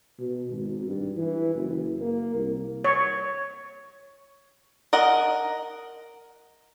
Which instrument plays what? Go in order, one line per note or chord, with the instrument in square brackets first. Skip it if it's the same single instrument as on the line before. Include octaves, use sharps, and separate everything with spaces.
[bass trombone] B2
G#1
G2
E3
F#1
A#3
C2
[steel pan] C#5
[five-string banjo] A#4 D#5 F#5